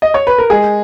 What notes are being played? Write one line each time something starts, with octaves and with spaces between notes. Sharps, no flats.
D#5
C#5
B4
A#4
G#3 G#4